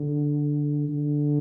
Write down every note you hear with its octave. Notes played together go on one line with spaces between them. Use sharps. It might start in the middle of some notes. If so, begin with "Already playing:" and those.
Already playing: D3
D3